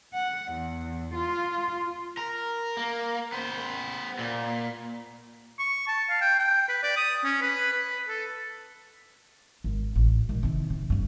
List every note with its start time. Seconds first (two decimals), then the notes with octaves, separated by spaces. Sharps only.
0.15 F#5
0.52 E2
1.14 F4
2.17 A#4
2.77 A#3
3.32 B3 C5
4.19 A#2
5.59 C#6
5.88 A5
6.10 F5
6.21 G5
6.39 G5
6.69 B4
6.83 D5
6.97 D#6
7.24 C#4
7.42 B4
7.73 B4
8.09 A4
9.64 G#1
9.96 A1
10.29 A#2 D#3
10.43 C3 D#3
10.70 C3
10.90 D2 G2